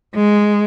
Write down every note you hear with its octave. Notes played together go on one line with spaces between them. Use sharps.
G#3